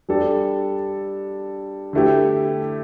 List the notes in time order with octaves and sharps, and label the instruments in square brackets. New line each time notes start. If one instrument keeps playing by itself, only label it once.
[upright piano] G3 D4 A4
D3 A3 E4 G4